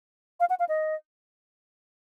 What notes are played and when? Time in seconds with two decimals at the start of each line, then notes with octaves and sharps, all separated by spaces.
0.40 F5
0.50 F#5
0.60 F5
0.69 D#5